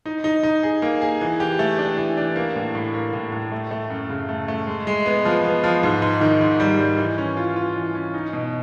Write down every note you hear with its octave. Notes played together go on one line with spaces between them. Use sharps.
D#4
D#4
D#4
G#4
A#3
G#4
E3
G4
A3
D4
E3
D4
A#3
A2
A2
A#3
A2
A2
A3
A3
F#2
C#3
A3
A3
G#3
G#3
B3
F3
B3
F3
G#2
G#2
D#3
G#2
G3
G3
E3
C#4
F4
F4
E3
C#4
D#4
B2